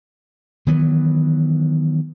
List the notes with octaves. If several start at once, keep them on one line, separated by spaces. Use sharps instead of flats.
D#3 E3 F#3 B3